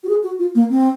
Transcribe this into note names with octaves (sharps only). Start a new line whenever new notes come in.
F#4
G#4
F#4
F4
A#3
C4